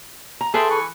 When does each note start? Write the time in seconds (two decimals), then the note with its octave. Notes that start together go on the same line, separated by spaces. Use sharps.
0.41 A#5
0.54 G#4 A4 B4 E5 G5 C6
0.70 E3 C#6